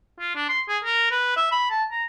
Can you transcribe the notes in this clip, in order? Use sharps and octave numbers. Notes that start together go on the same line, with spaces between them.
F4
D4
C6
G#4
A#4
B4
E5
B5
A5
A#5